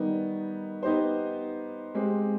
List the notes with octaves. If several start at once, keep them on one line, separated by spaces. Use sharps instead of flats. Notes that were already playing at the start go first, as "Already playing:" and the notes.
Already playing: D#3 G3 B3 D#4
B3 D#4 G4 C5
G#3 C4 G4